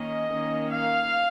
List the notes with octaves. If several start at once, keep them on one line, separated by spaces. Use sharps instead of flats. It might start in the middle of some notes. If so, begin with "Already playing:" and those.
Already playing: D#3 A#3 C#4 D#5
D#3 A#3 C#4
F5